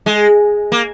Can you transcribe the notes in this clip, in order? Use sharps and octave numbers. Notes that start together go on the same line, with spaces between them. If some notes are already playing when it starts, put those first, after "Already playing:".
G#3
A#3